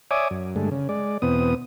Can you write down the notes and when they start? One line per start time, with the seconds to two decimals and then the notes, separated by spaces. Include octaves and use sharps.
0.11 C#5 D5 E5 G#5 D6 D#6
0.31 F#2
0.56 G2 D3 G#3 A3
0.71 C#3
0.89 G#3 D5
1.22 E2 B2 B3 C4 D#6